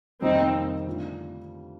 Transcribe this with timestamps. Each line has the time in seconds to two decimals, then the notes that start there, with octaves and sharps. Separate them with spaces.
0.22 F2 C3 D#3 G3 A#3 C4 D#4
0.87 D3 A3 D4 F4